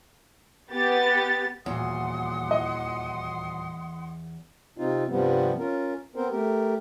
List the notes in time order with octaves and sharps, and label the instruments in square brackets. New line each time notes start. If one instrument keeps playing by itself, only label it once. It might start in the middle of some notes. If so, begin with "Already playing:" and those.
[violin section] B3 G4 A6
[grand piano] D#1 A#2 F#4 [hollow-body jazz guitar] E2 [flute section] F#5 C6 D#6
[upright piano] E3 D#5
[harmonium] C3 C4 D#4 F4
G2 C3 F3 G3 B3
C#4 F4 A#4
B3 C4 A#4 C5
A3 G4 A#4